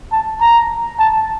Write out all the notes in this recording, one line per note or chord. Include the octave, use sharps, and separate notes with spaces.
A5
A#5
A5